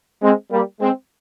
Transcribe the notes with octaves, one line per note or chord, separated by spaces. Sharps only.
G#3 C4
G3 A#3
G#3 C4